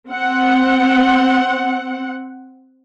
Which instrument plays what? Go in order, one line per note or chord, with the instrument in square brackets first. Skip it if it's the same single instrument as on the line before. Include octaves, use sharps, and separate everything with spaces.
[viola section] C4 F#5